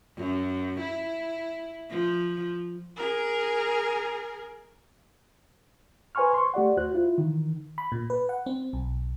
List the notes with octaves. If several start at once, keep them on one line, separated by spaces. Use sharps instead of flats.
F#2
E4
F3
G#4 A#4
B4 C5 G#5 C6 C#6 F6
C6 C#6
A3 G4 D5 F#5
D#2 F#4 C5 F#6
E4 F4
D#3 E3
B5
A#2
B4
F#5
C4
B1